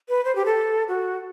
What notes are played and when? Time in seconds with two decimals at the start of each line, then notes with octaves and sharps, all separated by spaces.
0.09 B4
0.25 C5
0.36 G4
0.46 A4
0.88 F#4